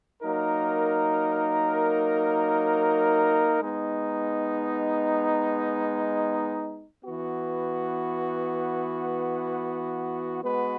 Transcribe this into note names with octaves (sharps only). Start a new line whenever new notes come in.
F#3 A#3 D#4 A#4
G#3 B3 D#4
E3 B3 F#4
G#3 B3 F#4 B4